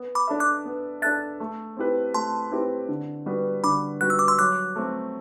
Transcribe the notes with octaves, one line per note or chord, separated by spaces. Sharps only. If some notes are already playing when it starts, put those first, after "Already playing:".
Already playing: B3
B5 D6
D4 A4 E5
D6 F#6
B3
D4 A4 E5 F#6 A6
A3
C4 E4 G4 B4
A3 A5 C6
C4 E4 G4 B4
D3
G3 B3 F#4 B4
D3 B5 D6
G3 B3 F#4 B4 F#6
E6
D6
C6 E6
F#3 D6 F#6
A3 C4